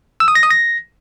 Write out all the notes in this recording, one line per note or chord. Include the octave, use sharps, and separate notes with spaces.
E6
D#6
A#6
D#6
A#6